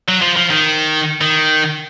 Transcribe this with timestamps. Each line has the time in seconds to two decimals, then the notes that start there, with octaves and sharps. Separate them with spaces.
0.08 F#3
0.21 F3
0.36 F3
0.50 D#3
1.21 D#3